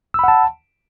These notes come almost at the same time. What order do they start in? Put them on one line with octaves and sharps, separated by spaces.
E6 B5 F#5 A5